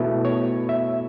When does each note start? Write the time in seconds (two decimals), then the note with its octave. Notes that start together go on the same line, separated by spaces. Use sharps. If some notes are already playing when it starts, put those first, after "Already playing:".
Already playing: B2 A3 E4 B4
0.25 C#5
0.69 E5